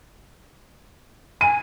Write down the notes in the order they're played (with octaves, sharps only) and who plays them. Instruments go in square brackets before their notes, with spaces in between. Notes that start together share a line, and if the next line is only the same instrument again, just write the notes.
[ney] G#5 [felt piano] D#7